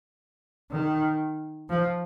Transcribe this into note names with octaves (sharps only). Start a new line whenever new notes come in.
D#3
F3